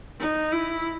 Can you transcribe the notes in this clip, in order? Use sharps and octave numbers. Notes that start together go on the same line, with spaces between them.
D#4
E4